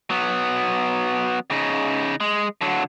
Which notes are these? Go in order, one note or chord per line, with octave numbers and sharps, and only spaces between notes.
F#3 B3
C#3 D#4
G#3
D3 F#3